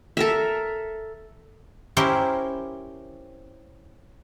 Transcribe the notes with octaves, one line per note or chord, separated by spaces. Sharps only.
A4 A#4 E5
C#4 E4 G4 A#4 C5